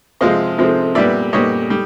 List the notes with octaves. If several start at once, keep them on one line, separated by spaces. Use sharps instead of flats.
C3 F3 G#3 C4 D#5 F5
C3 F3 G#3 C4
A#2 G3 B3 D5 E5
A#2 G3 B3 C#5 D#5
G3